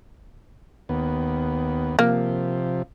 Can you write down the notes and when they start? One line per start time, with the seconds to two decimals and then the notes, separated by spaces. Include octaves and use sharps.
0.89 D#2 B3
1.99 C3 F3 A#3